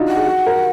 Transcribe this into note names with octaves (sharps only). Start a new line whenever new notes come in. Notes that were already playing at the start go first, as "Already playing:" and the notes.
Already playing: D4 D#4 F4 F#4
F#5
G#4
F#4
A#4